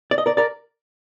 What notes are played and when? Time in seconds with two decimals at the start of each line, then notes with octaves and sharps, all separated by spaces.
0.11 D5
0.18 D#5
0.26 A#4 D5
0.37 A#4 D5